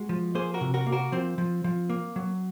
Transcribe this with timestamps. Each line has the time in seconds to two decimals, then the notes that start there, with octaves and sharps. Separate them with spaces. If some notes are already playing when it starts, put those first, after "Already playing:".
Already playing: G#3 F#4
0.09 F3
0.35 A#3 G#4 C5
0.54 F#4 A#4
0.61 C3
0.74 F#4 A#4
0.87 A#3
0.92 F#4 A#4
1.12 F3 C4
1.38 F3
1.64 F3
1.89 A#3
2.16 F#3